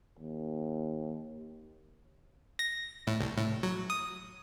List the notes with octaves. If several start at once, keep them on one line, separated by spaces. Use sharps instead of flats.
D#2
A#6
A2
C2
A2
F#3
D#6